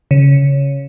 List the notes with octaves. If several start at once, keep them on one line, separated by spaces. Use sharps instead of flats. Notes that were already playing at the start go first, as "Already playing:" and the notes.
C#3